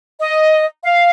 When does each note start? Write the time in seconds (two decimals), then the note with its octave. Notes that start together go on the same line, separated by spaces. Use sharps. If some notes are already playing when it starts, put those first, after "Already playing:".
0.19 D#5
0.84 F5